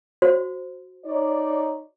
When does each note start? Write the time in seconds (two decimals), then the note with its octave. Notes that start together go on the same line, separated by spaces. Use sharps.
0.22 F#4 C5
1.06 D#4 C#5 D5